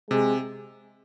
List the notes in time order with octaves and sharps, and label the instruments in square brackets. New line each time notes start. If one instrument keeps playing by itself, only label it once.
[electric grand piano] C3 [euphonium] G#3